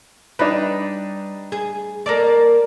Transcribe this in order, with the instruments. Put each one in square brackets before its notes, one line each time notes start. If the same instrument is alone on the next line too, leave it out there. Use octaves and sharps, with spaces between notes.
[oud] G3 [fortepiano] D4 D#4 B4
[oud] G#4
A#3 A4 D5